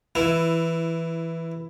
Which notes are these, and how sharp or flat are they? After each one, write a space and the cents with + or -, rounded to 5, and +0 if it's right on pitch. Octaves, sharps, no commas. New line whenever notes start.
E3 +0 E4 +15